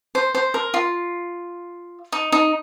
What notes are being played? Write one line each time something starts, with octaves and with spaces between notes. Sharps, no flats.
C5
C5
A#4
F4
D#4
D#4